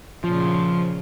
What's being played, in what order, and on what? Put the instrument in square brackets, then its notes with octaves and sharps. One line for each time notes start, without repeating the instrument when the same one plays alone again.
[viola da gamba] A#2 C#3 [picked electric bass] F3